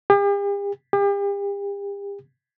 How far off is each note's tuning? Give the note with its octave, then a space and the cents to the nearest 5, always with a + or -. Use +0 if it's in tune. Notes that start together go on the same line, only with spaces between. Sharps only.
G4 +45
G4 +40